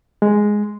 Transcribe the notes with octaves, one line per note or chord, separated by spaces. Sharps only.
G#3